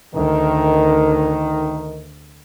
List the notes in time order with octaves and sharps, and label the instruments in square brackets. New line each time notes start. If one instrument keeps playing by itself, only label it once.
[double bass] D2 [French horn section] D#3